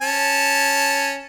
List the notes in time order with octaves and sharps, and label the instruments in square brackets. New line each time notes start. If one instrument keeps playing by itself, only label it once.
[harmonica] C#4 A5